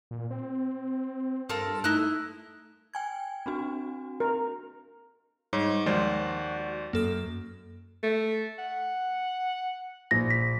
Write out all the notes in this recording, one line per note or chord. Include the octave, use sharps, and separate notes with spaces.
A#2
C4
G2 F4 A4 A#4
A3 D#4 E4 F#6
G5 G#5 G#6
C4 D4 F#4
A#4
G#2 G3 C#5
D#2 F3 G#3 F#4 C5 D5
F#2 A#3 A4 F6
A3
F#5
A#1 A#6
B6